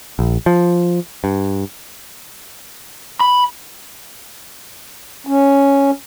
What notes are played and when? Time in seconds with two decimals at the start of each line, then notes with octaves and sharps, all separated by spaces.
0.19 A#1
0.46 F3
1.24 G2
3.21 B5
5.27 C#4